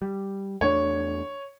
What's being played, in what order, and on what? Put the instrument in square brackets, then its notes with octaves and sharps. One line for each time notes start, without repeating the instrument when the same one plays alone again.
[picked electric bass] G3
[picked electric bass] E2 A3 D4 [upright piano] C#5